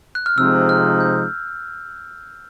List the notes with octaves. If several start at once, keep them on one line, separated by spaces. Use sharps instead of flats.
F#6
F6
C3 F3 G#3 C4 D#4 E6
F6
G6